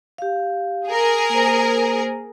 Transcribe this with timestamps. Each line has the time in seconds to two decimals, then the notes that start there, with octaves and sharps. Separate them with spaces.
0.18 G4 F5
0.87 G#4 A#4
1.30 A#3 C5